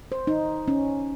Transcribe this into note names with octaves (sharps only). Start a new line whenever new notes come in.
C5
D#4
C#4